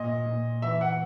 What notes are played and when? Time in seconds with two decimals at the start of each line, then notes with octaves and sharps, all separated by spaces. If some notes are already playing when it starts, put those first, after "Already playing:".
Already playing: A#2 D#5
0.26 A#2
0.62 E3 E5
0.81 F#5